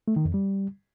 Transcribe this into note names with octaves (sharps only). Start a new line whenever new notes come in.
A3
D#3
F2
G3